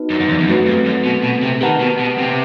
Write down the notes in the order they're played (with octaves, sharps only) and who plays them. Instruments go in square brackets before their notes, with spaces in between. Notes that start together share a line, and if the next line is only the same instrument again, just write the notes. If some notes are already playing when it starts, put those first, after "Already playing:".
Already playing: [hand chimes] B3 D#4 F#4 B4
[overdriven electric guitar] F#2
F#2
E2
E2
[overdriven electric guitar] F#2 [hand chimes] A3 C4 F#4 B4
[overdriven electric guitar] G2
F#2
B2
B2
C3
[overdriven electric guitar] D#3 [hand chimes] G4 B4 F#5 A5
[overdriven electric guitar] B2
B2
C3